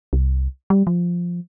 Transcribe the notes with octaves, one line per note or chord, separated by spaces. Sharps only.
C2
G3
F3